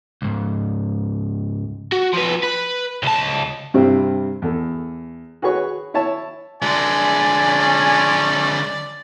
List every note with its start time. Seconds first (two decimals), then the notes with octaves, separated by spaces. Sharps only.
0.22 C#2 G#2
1.92 F#4
2.13 F3 B4
2.43 B4
3.03 C#2 A5
3.74 G2 C3 G3 C4 E4
4.42 E2 A4
5.42 F#4 G#4 B4 C#5 C#6
5.94 E4 C#5 A5
6.62 D3 G#3 D5 G#5
7.47 C#4